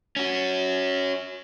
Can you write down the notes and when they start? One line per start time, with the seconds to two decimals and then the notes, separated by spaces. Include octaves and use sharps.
0.16 C#4 F#4